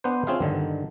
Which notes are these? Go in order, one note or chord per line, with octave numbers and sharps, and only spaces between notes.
B3 D4 B4 C5
C4 C#4 F4 G#4 E5 F5
G2 D3 D#3